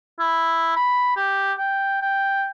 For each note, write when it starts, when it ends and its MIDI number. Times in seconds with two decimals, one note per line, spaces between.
0.20 0.76 64
0.76 1.13 83
1.16 1.53 67
1.58 2.02 79
2.02 2.49 79